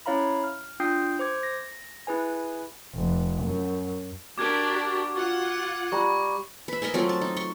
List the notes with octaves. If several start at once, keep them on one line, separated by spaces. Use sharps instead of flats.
C#4 E4 C#5 F5 A#5 B5
F6
D4 F4 G5 D#6 G6 C7
C5 D6 G#6
A#6
E4 G#4 B4 G#5
F1
F#2
D4 F#4 G4 A#4 D6 G#6
F4 F#5
G3 A#5 C#6
B4 E5
A#4 D#5 E5 G#5
F#3 A3 C4 F4
A5
D#4
C6 C#6